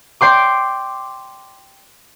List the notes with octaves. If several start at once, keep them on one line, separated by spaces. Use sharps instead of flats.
D5 G5 C6 D6